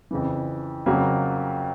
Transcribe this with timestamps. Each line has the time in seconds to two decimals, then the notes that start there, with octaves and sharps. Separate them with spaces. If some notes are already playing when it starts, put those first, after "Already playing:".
0.11 F2 C#3 E3
0.86 F2 C#3 F#3 A#3